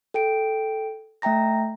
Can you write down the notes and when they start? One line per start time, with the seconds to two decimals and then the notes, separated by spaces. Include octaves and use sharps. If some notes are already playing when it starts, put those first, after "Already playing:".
0.14 A4 G5 D7
1.22 A3 E5 G5 A#5 A#6